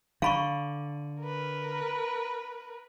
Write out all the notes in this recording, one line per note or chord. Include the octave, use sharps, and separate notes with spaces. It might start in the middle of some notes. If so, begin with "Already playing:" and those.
D3 F5 B5 C#6
A#4 B4